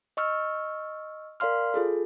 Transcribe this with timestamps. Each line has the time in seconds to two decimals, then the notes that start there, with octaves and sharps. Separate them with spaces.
0.17 D#5 C#6 E6 F6
1.40 A#4 D5 F5 C6 F6
1.74 F4 G#4 A4